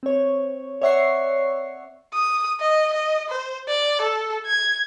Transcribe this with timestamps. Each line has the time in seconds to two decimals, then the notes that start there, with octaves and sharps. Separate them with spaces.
0.03 C4 C#5
0.82 C#5 D5 E5 F#5 C#6 C7
2.13 D#6
2.61 D#5
2.93 D#5
3.29 C5
3.68 D5
4.02 A4
4.46 G#6